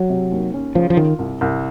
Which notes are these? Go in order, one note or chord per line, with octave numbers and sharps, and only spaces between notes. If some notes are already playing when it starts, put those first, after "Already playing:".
Already playing: F#3
C3
D#2
C#4
C#3 F3
F3
D#3 F4
C2
C2